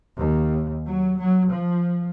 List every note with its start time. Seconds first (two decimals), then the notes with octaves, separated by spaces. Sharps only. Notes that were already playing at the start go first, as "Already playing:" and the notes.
0.18 D#2
0.86 F#3
1.19 F#3
1.52 F3